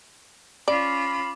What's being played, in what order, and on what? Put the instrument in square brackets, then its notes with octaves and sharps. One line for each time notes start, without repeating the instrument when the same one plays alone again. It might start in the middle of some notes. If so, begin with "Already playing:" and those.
[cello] C#4 F4 [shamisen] D5 [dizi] B5 [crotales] D6